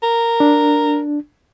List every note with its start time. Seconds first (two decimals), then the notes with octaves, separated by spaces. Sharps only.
0.03 A#4
0.40 D4